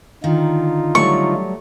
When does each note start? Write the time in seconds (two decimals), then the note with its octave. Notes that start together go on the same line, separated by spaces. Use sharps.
0.24 D3 D#3 D#4 F4
0.95 F#3 G3 A3 C#6